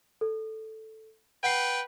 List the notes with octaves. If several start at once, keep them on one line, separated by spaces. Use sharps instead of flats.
A4
B4 F#5 G5 C7